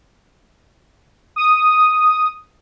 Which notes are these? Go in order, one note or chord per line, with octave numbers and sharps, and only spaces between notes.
D#6